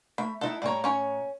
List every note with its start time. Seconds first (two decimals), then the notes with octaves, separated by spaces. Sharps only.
0.18 A3 B5
0.41 D#4 E4 A4 F#5
0.62 A2 G3 C#5 G#5 A#5
0.84 C#4 C#5